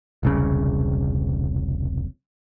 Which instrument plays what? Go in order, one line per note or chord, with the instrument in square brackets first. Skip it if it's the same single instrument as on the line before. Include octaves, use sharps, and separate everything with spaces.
[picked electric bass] E1 C2 C#3